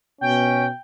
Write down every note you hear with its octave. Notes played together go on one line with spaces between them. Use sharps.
B2 C#4 G5